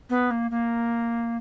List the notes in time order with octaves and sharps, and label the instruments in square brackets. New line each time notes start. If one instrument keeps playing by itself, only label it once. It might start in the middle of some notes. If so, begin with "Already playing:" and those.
[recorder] B3
A#3
A#3